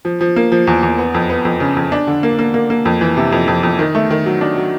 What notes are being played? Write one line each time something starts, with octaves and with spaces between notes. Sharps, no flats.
F3
F3
A#3
F3
E2
E2
B3
F2
B3
F2
C#3
F2
D4
D3
A#3
A#3
A#3
A#3
F2
E3
C3
F2
F2
F2
D#3
A3
D#3
F#3
D4
F#3